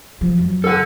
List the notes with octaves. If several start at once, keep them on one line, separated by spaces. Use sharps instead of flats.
F3
F#2
A4 F#5